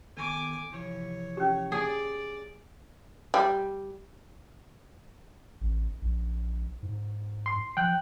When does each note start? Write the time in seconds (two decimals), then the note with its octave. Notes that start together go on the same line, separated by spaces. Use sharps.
0.17 D#3 B3 A4 G#5 D6
0.72 C3 E3 F3 C#5
1.37 C#4 G4
1.72 G#4 D5
3.34 G3
5.61 A1
6.02 A#1
6.82 G#2
7.46 C6
7.77 F3 G5 F#6